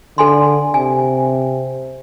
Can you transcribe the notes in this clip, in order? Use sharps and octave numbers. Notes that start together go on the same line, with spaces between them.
D3 A4 G#5 C6
C3 G#5